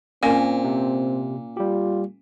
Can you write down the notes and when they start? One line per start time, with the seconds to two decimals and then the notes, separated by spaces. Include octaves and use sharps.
0.23 A#2 C4 C#4 A#4 G#5
0.64 C3
1.57 G3 F4 G4